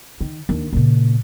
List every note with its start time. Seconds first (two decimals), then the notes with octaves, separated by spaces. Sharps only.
0.21 D#3
0.49 D#2 D4
0.73 A#2 C#3